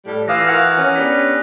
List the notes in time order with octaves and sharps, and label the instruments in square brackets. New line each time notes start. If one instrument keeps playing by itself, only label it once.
[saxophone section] A2 G3
[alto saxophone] E3 [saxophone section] F4 F5 [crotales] D6 D#6 A#6
[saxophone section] F#4 A#4 F#5 [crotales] F#6 F7
[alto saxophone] C#4
[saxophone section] B3 D4 G4 [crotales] B6